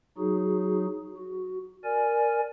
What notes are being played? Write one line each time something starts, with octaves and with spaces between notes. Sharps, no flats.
F#3 D#4 F#4 G#4
F#4
A#4 D5 G#5